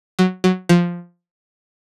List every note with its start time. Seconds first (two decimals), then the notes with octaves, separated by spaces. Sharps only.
0.19 F#3
0.44 F#3
0.69 F3